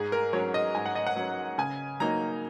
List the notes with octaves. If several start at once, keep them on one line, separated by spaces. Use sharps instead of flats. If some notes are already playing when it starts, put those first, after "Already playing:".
Already playing: G#2 G#4
A#4
F#3 C#4 C#5
D#5
G#2 G#5
F#5
D#5
F#5
F#3 C#4
C#3 G#5
F#3 A#3 D#4 A#5